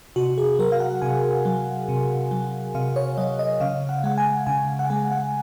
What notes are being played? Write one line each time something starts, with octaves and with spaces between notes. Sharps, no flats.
C3 F#4
G#4
F#3 A#4
F5
F#5
C3 G#5
F#3
C3
F#3
C3 F5
C#5
F#3 D#5
D#5
C#3 F5
F#5
G#3 F#5
G#5
C#3 G#5
F#5
G#3 G#5
F#5